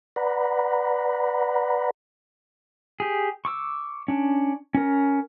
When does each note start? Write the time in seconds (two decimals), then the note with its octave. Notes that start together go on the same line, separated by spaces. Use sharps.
0.16 B4 D5 F#5 A#5 B5
3.00 G4 G#4
3.45 C#6 D6 E6
4.08 C#4 D4
4.75 C#4 A#4